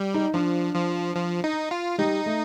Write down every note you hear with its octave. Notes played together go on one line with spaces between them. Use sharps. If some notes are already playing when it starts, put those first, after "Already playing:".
Already playing: G3
D#4
F3 D4
F3
F3
D#4
F4
G3 D#4
A3